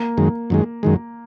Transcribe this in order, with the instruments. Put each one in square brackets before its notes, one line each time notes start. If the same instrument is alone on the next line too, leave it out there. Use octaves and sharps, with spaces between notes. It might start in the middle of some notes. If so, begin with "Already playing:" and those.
Already playing: [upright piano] A#3
[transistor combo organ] F#2 D#3 G#3
F#2 D#3 G#3
F#2 D#3 G#3